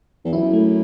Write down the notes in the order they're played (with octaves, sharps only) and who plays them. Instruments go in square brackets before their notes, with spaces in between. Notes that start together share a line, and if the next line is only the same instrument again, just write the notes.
[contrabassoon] E2
[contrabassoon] F#2 [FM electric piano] E4
[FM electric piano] A3